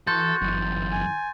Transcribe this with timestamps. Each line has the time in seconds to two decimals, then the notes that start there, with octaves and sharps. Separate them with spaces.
0.07 E3 F#4 A4 C6 G6 A6
0.41 G1 F#2 E3
0.92 G#5